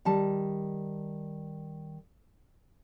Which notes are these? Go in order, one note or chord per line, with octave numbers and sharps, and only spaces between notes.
D#3 G3 A5